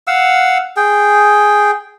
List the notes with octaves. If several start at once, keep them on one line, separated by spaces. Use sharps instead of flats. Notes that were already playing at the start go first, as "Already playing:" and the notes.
F5 F#5 E6
G#4 G5